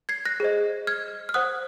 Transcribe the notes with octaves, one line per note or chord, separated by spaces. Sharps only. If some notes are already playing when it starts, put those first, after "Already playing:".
G#6 C7
F#6 A#6
G#4 C5 D#5
F6 G#6
F6
C5 F#5 D#6 F#6